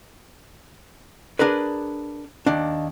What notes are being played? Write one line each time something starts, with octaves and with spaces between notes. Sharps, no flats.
D4 G#4 A#4 B4
D#2 D4